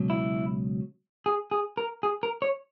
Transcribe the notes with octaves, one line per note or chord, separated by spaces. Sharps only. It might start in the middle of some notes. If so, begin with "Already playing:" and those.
Already playing: C#2 B2 F#3
E4
G#4
G#4
A#4
G#4
A#4
C#5